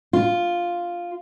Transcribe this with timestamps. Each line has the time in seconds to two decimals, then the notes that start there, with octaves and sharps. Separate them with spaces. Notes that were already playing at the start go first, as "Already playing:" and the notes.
0.13 F4